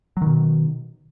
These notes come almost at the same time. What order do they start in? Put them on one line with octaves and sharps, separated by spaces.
F#3 D#3 B2